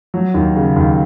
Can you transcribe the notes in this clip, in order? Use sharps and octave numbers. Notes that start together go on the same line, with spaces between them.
F#3
D#2
C#3
D#2